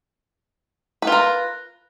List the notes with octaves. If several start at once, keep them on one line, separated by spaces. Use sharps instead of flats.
F4 A#4 B4